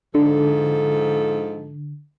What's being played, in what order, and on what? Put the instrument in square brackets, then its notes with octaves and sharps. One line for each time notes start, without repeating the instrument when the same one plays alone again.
[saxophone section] G#2 F3 A4 [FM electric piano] D3